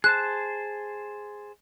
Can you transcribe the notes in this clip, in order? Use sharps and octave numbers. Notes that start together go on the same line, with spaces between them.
G#4 C5 A5 F#6